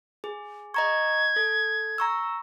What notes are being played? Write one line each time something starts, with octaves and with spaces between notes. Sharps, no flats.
G#4
D#5 A#5 C#6 G#6
A4
A#5 C#6 E6